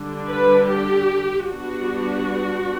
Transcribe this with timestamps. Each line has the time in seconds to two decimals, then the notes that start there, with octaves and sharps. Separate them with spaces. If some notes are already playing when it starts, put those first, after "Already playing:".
Already playing: D3 G3 D4
0.28 B4
0.68 G4
1.49 G3 B3 D4 F#4